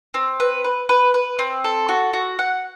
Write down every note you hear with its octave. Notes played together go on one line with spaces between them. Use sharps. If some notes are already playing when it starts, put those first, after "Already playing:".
C4
B4
B4
B4
B4
C4
A4
F#4
F#4
F#5